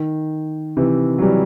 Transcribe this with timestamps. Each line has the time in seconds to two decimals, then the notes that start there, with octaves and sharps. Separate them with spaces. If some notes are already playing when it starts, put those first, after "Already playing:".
Already playing: D#3
0.77 C3 E3
1.18 F#3
1.22 E3 G3